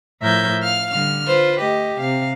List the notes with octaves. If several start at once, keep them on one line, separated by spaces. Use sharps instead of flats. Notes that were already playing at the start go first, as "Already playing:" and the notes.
A2 F3 A#4 E5 G6 G#6
F5 F6
D3 G3 F6
F4 B4 C5
A3 G4 D#5
C3 F5